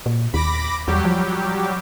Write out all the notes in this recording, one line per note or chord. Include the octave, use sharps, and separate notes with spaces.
A#2
D#2 B5 D6 A#6
E2 F#3 G3 G4
F3